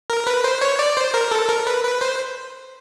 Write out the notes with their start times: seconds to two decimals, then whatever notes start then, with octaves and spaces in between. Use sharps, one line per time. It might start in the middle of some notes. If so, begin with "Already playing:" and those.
0.10 A#4
0.27 B4
0.44 C5
0.61 C#5
0.79 D5
0.97 C5
1.14 A#4
1.31 A4
1.49 A#4
1.67 B4
1.84 B4
2.01 C5